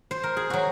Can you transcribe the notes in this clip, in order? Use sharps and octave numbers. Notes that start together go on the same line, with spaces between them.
C5
A#4
G#4
F#3 F#4